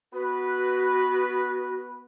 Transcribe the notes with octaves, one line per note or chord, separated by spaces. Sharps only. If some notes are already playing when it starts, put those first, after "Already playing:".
B3 F#4 B4